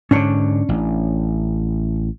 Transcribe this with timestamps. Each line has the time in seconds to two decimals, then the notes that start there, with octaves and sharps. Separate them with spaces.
0.11 G#2 D3 C#4 D4 C#5
0.69 A1